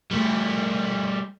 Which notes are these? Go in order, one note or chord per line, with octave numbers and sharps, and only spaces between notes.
G3 A3